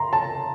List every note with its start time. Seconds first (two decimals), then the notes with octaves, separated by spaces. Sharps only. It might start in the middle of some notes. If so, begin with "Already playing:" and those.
Already playing: A#5 C6
0.13 A5